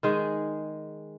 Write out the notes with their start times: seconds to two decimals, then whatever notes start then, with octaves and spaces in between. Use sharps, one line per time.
0.03 D#3 G#3 G#4